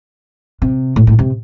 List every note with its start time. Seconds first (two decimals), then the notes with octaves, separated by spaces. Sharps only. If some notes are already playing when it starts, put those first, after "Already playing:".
0.62 C3
0.96 A2
1.07 A2
1.19 C3